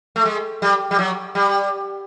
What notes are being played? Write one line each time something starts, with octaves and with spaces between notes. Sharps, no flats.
A3
G#3
G3
G3
F#3
G3